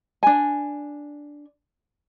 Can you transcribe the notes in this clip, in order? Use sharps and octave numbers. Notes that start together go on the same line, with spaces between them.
D4 G#5